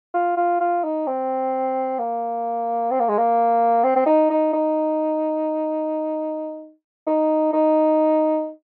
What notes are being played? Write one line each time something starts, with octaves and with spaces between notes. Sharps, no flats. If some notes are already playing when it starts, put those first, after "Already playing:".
F4
F4
F4
D#4
C4
A#3
C4
A#3
G#3
A#3
C4
C4
D#4
D#4
D#4
D#4
D#4